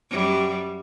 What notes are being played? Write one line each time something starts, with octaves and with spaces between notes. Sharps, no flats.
F#2 G3